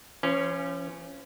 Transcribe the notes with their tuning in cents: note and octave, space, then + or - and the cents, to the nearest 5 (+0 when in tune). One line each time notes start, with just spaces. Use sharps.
F3 -40 C#4 -5